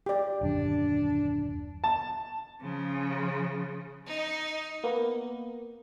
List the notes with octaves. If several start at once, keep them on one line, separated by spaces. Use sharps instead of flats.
G4 D5
D#1 F#2 D3 D4
A5
C#3 F3
D#4
A#3 B3